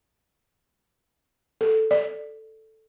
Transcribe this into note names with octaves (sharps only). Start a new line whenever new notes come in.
A4
D5